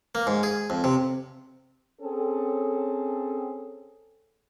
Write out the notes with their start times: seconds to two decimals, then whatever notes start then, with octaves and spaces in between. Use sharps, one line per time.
0.15 A#3
0.27 G#2
0.43 G#4
0.70 F2
0.84 C3
2.01 C4 C#4 G#4 A4